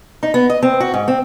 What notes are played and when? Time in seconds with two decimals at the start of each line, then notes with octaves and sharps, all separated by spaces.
0.23 D#4
0.34 B3
0.50 D#5
0.63 C4
0.80 F#4
0.94 G#2
1.08 C4